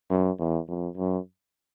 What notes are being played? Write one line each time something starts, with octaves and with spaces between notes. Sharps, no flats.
F#2
E2
F2
F#2